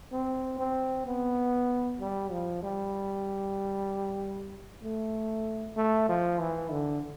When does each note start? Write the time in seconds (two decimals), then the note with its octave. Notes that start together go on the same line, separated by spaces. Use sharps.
0.12 C4
0.59 C4
1.06 B3
2.00 G3
2.31 F3
2.63 G3
4.83 A3
5.76 A3
6.09 F3
6.39 E3
6.71 D3